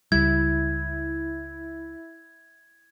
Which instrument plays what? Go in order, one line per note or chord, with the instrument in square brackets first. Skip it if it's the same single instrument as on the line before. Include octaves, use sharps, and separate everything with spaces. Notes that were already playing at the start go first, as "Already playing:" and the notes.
[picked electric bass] C#2 G3 [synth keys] E4 [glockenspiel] G#6